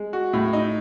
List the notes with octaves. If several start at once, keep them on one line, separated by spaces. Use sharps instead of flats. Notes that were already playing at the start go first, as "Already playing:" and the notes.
Already playing: G#3
F#4
A2
D#4